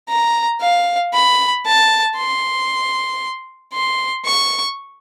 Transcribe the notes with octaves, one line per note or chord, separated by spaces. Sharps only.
A#5
F5
B5
A5
C6
C6
C#6